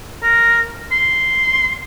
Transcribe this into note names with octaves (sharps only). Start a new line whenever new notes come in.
A#4
C6